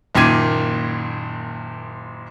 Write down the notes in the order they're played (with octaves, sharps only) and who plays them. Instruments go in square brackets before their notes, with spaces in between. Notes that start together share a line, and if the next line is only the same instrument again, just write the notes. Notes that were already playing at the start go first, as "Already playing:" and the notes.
[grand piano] F#1 A#2 D#3 D6 G#6 D#7